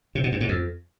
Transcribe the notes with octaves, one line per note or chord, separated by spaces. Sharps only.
C3
B2
G2
G#2
F2